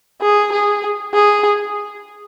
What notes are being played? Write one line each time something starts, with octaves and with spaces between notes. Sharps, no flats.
G#4
G#4
G#4